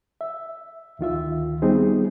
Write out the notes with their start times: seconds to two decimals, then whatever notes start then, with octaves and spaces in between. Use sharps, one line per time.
0.21 E5
0.99 D2 D#3 F4 E5
1.62 G3 B3 C4 D#4 G#4